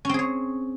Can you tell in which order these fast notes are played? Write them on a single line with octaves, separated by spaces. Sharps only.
C#4 C4 G#4 C#5